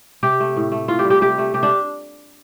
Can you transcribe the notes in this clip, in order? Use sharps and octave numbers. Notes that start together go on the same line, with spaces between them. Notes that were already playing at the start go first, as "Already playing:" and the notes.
C3 G4
A3
A2
A3
A2 F4
G4
G3
G4
C3 G4
A3
C3 G4
D4